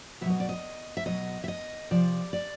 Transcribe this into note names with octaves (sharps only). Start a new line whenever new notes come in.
B2 F#3 D#5 E5
D5
D#5
E5
B2 F#3 D#5
E5
D#5
C3 F3 D5
D5